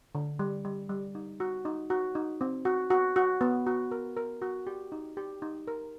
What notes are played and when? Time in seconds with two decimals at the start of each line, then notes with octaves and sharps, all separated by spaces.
0.15 D3
0.39 G3
0.65 G3
0.89 G3
1.15 D#4
1.40 F#4
1.65 D#4
1.90 F#4
2.15 D#4
2.41 C4
2.65 F#4
2.90 F#4
3.16 F#4
3.41 B3
3.67 F#4
3.91 A#4
4.17 A#4
4.42 F#4
4.67 G4
4.92 D#4
5.17 G4
5.42 D#4
5.68 A#4